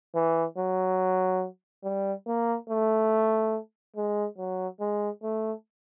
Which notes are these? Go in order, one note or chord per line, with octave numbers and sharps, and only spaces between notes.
E3
F#3
G3
A#3
A3
G#3
F#3
G#3
A3